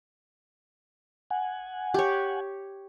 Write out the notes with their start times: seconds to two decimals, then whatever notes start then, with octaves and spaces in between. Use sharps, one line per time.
1.30 F#5 G#5
1.94 G4 C#5